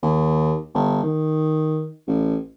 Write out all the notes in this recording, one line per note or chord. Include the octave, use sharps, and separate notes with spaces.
D#2
G1
D#3
A1